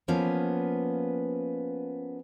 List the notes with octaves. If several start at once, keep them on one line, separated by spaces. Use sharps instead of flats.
F3 A#3 B3 C#4